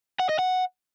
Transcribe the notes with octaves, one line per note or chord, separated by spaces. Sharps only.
F#5
D#5
F#5